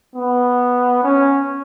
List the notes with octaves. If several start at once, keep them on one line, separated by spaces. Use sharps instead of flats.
B3
C#4